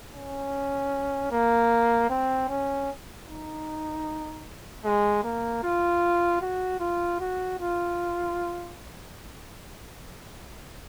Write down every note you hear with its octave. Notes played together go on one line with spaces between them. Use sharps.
C#4
A#3
C4
C#4
D#4
G#3
A#3
F4
F#4
F4
F#4
F4